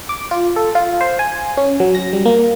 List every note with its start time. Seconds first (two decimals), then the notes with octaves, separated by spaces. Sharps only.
0.09 D6
0.31 F4
0.56 A4
0.75 F4
1.01 C5
1.19 G#5
1.57 C#4
1.80 F#3
1.95 A#6
2.13 G3
2.25 A#3